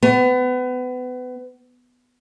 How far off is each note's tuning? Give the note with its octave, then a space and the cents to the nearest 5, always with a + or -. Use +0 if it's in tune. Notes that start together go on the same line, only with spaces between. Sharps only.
B3 +30